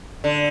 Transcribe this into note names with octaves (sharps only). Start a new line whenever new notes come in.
D3